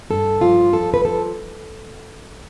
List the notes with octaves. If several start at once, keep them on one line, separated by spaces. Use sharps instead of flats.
G2 A4
F3 F4
F3 A4
B4
F3 A4